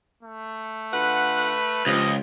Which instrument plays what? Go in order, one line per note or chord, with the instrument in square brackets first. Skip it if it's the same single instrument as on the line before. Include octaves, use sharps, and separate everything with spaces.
[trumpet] A3
[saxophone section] D3 F4 F#5 [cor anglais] B4
[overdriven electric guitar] C#2 [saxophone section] F3 G4 [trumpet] D#5